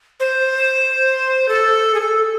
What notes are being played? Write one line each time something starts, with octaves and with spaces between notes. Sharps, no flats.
C5
A4
G#4
A4